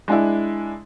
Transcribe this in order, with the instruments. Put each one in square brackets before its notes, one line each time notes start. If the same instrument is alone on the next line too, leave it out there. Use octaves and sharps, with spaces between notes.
[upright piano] G#3 D4 E4